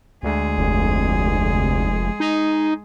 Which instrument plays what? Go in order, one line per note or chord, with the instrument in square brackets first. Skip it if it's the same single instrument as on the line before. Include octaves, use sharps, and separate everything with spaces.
[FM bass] D2 [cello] G#3 G#4
[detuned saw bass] F1
[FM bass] D#4